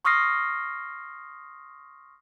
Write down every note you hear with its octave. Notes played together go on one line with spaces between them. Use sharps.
C6 C#6 D#6 F6 A#6 C7